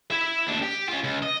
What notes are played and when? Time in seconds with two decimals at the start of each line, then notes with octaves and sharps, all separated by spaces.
0.11 E4 E5
0.47 D#2 D4
0.62 G4
0.89 C#4 F4
1.04 C#2
1.22 D#5